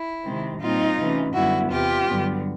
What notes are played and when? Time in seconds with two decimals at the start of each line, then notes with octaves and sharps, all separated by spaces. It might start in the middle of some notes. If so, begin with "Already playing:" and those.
Already playing: E4
0.25 C3 D#3 G#3 C4
0.61 A#2 G3 C4 D#4 F4
0.98 C3 E3 A3 C#4
1.34 F#2 D3 G3 B3 E4 F#4
1.71 E2 C3 E3 F4 G4
2.07 G2 D3 F#3 B3